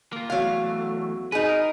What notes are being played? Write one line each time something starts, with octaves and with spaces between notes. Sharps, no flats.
A#3 F4
E2 F#3 A3 F5
D#4 G#4 B4
A#4